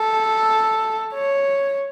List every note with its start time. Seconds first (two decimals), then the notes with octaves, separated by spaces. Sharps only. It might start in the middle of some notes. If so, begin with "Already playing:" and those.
Already playing: A4
1.14 C#5